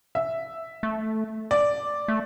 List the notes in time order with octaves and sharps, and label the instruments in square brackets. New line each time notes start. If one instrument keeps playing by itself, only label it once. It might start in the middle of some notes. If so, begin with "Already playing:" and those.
[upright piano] E5
[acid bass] A3
[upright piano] D5
[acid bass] A3